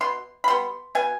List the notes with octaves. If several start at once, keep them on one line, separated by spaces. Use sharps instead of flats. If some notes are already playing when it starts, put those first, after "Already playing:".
B2 C6
B5
G3 B3 C6
B2 G#5